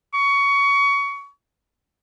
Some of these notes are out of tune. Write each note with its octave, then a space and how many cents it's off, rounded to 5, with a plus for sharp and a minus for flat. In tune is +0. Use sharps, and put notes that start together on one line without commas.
C#6 +20